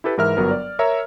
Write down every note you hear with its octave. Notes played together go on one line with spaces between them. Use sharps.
E4 G4 A4 B4
G#2 E3 A#4 E5 F6
G1 F#3 B3 A#4
D5
A#4 C#5 E5 A#5 E6